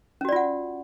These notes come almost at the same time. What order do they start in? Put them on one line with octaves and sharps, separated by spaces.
C#4 F#4 D5 F4 F#5